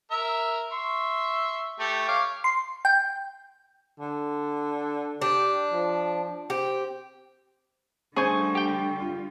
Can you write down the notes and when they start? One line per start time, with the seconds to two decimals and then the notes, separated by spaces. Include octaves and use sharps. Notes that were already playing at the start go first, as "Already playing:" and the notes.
0.11 A#4 E5
0.72 E5 C6 C#6
1.79 A3 G4 C#6
2.08 C#5 F5 D6
2.44 C6
2.85 G5
4.00 D3
5.22 D4 G4
5.73 F3
6.50 C4 G4
8.16 D3 G3 A3 G#4 C5 G#5 C#6
8.55 G4 G5
9.00 F4